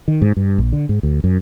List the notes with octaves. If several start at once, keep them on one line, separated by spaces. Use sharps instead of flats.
D#3
G#2
G2
A#1
D3
G#2
D2
F#2